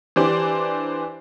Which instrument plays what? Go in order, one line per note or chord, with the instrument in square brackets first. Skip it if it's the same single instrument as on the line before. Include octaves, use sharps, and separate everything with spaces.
[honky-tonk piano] E3 D4 G4 C5 D5